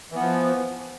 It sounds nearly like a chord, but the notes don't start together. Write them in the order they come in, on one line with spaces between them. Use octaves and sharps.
E3 B3 F3